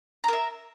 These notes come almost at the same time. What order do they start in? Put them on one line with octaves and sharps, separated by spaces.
A#5 A#4 E5